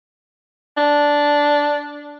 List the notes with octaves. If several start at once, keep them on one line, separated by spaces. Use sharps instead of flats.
D4